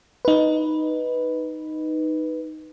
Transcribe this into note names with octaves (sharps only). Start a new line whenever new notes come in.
D#4 B4